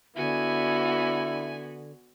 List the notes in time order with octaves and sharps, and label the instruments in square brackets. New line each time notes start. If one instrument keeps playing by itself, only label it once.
[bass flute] D3 [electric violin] B3 F#4 [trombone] E4 [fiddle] G#5